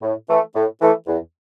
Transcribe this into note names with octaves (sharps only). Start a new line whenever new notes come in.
A2
E3 A3
A2
E3 A3
E2